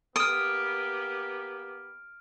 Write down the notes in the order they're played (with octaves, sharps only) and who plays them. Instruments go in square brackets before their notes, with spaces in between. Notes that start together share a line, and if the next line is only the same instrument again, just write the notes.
[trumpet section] A#3 B3 G4 [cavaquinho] D#6 [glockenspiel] F6 D7